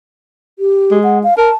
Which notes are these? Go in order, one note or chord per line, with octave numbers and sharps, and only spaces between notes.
G4
G#3
F#5
F5
A#4 A5